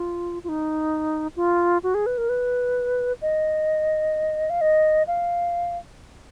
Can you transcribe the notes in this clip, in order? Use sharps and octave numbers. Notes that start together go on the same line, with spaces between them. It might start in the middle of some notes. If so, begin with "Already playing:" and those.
Already playing: F4
F4
D#4
F4
F#4
G#4
B4
A#4
B4
D#5
F5
D#5
F5